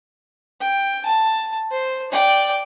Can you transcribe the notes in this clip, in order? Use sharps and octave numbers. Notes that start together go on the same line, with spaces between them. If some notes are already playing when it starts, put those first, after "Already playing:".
G5
A5
C5
D5 G5